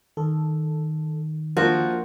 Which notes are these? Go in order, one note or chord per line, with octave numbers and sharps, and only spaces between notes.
D#3 A4
F3 A#3 D4 F#4 A#4